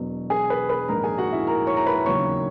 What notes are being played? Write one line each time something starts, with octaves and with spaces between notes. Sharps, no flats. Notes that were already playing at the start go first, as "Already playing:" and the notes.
Already playing: E1 E2 B2 F#3
G#4 G#5
B4 B5
B4 B5
A#1 G#2 D#3 A#4 A#5
G#4 G#5
F#4 F#5
E4 E5
A#4 A#5
C#5 C#6
A#5
B4 B5
E1 D#2 C#3 F#3 A#3 C#5 C#6